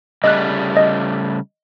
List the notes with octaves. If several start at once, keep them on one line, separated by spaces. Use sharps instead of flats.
C#3 G3 A3 D#5 F#6
D#5